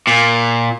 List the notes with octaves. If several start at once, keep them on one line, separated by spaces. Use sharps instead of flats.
A#2